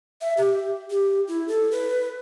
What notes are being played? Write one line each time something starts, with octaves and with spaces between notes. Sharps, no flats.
E5
G4
G4
E4
A4
B4